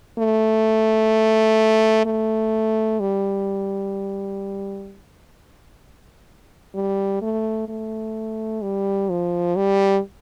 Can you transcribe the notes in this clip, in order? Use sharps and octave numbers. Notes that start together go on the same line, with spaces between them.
A3
A3
G3
G3
A3
A3
G3
F3
G3